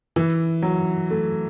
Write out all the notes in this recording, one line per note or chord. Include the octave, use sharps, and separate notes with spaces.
E3
F#3
A3